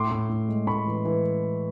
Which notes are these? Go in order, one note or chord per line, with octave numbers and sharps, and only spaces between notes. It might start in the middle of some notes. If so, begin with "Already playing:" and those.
Already playing: A2 C6 D6
A2
A2
G#3
A2 B5 C#6
E3
E3